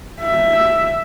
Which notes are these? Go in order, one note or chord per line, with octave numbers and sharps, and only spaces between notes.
E5